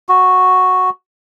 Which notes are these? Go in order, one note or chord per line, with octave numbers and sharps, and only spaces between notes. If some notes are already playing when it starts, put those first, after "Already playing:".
F#4